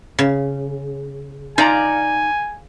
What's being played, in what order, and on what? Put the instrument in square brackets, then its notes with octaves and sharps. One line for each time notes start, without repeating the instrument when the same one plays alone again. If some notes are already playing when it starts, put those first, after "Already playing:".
[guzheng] C#3
[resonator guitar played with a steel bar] D#4 D5 A#5 [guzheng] F4 [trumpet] G#5